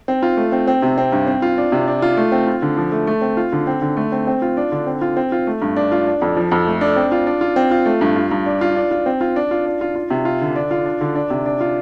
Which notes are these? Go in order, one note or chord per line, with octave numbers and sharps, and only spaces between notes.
C4
F4
A3
C4
C4
C3
C4
G2
C4
F4
D4
C3
D4
F4
A3
C4
F4
D3
F3
A3
A3
C4
F4
D3
C4
D3
A3
C4
C4
F4
D4
D3
C4
F4
C4
F4
A3
G2
D4
F4
D4
F2
F3
F2
A3
D4
C4
F4
D4
F4
C4
F4
A3
G2
F4
G2
D4
F4
D4
F4
C4
F4
D4
F4
D4
F4
F4
C3
F4
D3
D4
F4
D4
D3
D4
C3
D4
F4